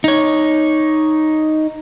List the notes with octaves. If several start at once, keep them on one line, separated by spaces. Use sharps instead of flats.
D#4 C#5